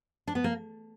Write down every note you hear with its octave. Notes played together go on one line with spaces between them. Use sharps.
D4
B3
A#3